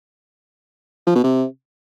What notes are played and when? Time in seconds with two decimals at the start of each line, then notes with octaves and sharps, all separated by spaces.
1.07 F3
1.15 B2
1.24 C3